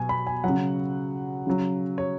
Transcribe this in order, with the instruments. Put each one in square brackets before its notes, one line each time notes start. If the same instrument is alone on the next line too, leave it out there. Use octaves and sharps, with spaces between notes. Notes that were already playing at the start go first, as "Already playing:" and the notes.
Already playing: [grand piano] B2 F#3 G#5
B5
G#5
F#3 F#5
C#3
C#3 F#3
C#5